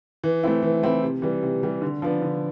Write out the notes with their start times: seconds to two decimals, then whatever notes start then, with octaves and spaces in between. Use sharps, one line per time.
0.24 E3
0.43 A3 C4 E4
0.62 E3
0.83 A3 C4 E4
1.03 C3
1.22 E3 G3
1.43 C3
1.63 E3 G3
1.82 D3
2.02 F3 B3 D4
2.22 D3